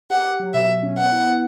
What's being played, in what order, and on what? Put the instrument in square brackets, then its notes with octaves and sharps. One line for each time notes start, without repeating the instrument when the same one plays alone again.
[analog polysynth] G4 [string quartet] F#5
[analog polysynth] G4
F#3
[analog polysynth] B2 [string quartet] E5
[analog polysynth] B2
C#4
[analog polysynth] B3 [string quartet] F#5
[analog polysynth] E4
B3